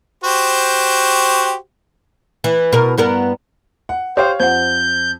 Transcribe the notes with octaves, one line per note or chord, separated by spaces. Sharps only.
F#4 G4 C5
E3
B2 A#4
G2 B3 A#4
F#5
G4 C5 C#5 F5 G5
F2 C5 F#5 G6